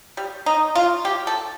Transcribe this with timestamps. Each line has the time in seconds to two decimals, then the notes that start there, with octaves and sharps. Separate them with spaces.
0.17 G3
0.46 D#4
0.75 F4
1.05 G4
1.27 A4